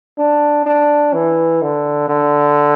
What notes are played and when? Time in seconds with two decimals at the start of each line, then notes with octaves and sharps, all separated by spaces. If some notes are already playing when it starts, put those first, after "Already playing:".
0.19 D4
0.66 D4
1.13 E3
1.62 D3
2.09 D3